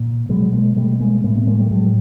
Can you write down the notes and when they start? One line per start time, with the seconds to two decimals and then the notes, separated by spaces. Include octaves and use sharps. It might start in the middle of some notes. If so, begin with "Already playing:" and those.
Already playing: A#2
0.29 B2 F#3 G#3
0.53 G#3 A#3
0.76 B2 G3 A3
1.00 G#3 A#3
1.24 A2 G#3 A#3
1.36 A#3 C4
1.47 G#3 A#3
1.59 G3 A3
1.71 A2 F#3 G#3